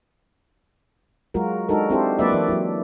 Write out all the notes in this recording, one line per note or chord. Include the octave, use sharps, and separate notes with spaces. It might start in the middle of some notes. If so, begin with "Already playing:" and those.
F#3 G#3 F4 F#4 A#4
G#3 D4 D#4 F#4 A4 A#4
C4 D4 E4 G4 A4 C5
F#3 A#3 D4 B4 D5 E5
E3 E4
F#3 E4